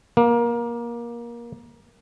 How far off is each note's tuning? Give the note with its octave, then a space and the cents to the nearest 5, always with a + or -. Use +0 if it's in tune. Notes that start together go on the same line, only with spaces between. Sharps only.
A#3 +20